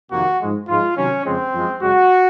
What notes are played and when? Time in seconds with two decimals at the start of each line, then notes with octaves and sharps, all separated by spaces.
0.12 F2 C3 D#3 A#3 F#4
0.40 G#2 F3 G#3
0.68 G#2 F3 G#3 F4
0.96 C3 D#3 F#3 C#4
1.24 F2 C#3 F3 G#3 C4
1.53 F#2 F3 G#3
1.81 F#2 C#3 G#3 F#4